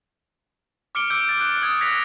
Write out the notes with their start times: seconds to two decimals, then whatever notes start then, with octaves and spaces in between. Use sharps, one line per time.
0.95 D6 F6 C#7 D7 G7
1.10 D6 E6 G6 D7
1.29 A6
1.41 F#6
1.62 D#6 G#6
1.80 F#6 G#6 A#6 B6 C#7 F7